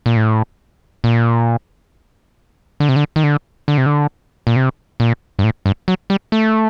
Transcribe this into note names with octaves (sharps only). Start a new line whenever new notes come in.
A#2
A2
A#2
D3
C3
D3
D#3
D3
D3
C3
D3
A#2
C3
A#2
G2
A2
G2
F#3
G3
A3